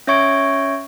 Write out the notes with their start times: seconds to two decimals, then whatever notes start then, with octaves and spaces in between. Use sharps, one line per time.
0.07 C#4 C#5 E5 C#6 G#6 D7